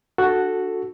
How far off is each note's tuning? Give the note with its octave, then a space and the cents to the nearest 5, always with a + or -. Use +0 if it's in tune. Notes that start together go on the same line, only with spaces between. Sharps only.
D4 +20 F#4 +0 A4 +0